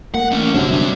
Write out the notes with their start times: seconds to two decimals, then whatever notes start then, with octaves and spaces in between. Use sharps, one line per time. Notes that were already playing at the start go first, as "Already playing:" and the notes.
0.14 A#3 F#5
0.31 A3 C#4
0.54 G1 C3 F#3 D4 E5
0.72 G3 D4